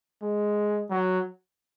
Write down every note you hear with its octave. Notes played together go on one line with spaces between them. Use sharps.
G#3
F#3